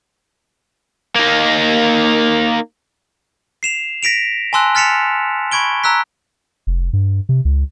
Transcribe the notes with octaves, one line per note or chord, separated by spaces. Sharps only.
A#3 D#4
C7 E7 F7
A#6 B6 D7 F7
G#5 A5 C6 E6 F#6
F6 A6 B6 C#7 E7 F7
B5 C#6 G#6 D7 G7
A#5 E6 F#6 B6
F1
G2
C3
C#2